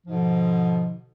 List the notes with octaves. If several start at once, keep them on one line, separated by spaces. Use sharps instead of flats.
G#2 B2 D3 F3